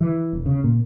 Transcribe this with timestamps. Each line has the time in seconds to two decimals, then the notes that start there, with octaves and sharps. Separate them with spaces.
0.01 E3
0.33 E1
0.46 C#3
0.64 A#2